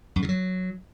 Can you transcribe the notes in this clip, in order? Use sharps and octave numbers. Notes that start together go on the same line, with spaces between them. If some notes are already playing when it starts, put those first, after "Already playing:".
F#2
C#3
F#3